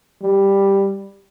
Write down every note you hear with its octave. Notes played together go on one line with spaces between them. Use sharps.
G3